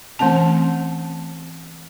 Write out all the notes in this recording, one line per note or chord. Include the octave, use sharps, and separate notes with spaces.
E3 A3 C4 C#4 A5